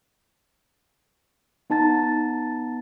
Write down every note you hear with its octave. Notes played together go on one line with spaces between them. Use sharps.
B3 D#4 A5 A6